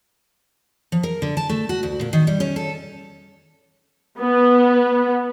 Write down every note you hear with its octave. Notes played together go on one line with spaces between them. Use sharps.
F3
A#4
D3
A5
A3
F#4
D2
A#2
D#3
G3
C#4
A4
B3